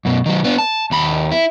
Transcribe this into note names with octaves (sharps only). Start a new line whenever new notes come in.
F#2 B2
D#3 F#3
B3 D4
A5
D#2 B5
E4